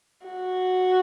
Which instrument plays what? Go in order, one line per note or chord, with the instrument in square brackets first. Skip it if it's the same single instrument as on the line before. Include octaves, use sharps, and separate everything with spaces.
[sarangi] F#4